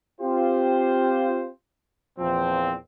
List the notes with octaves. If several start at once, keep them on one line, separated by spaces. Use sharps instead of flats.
C4 F4 G4 C5
E2 A#2 F3 C4